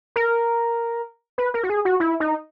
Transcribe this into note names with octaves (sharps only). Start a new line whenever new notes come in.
A#4
B4
A#4
F#4
G#4
F#4
E4
D#4